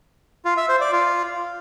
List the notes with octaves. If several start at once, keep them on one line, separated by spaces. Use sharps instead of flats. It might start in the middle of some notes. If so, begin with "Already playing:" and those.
F4
E5
C5
D5
F4